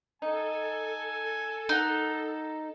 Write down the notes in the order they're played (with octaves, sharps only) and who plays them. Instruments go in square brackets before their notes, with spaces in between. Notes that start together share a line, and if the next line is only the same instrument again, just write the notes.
[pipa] D#4 [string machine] A4 [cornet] G#5
[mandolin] D#4 [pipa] A#4 F#5